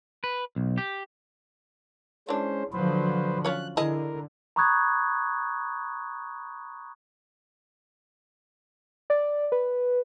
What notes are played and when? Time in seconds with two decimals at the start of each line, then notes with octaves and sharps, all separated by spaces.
0.24 B4
0.56 B1
0.77 G4
2.29 E3 G#3 C#4 D4 C5
2.73 D3 F3 F#3 B4 C5
3.45 C#4 F4 C#5 F#6
3.77 D3 E4 G#4 A#4 D#5
4.56 A#5 B5 C#6 D#6 F#6 G#6
9.10 D5
9.52 B4